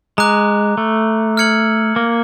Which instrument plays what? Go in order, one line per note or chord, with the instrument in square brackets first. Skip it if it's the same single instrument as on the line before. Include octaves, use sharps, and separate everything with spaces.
[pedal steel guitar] G#3 [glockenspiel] A#5 D6 F#6
[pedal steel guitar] A3
[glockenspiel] F6 G#6 C#7 F#7
[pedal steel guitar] A#3